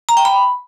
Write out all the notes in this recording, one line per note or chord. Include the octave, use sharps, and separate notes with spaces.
A#5
G5
B5